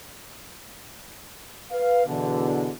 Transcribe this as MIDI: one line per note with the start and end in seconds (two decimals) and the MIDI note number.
1.72 2.03 71
1.72 2.03 77
2.06 2.71 40
2.06 2.71 47
2.06 2.71 50